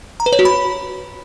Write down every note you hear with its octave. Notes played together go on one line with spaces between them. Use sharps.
A#5
B4
C#5
F#4
B5